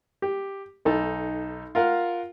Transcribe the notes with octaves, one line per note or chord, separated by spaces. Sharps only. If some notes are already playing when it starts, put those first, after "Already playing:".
G4
B1 D#4 A4 A5
F4 A#4 F5 F#5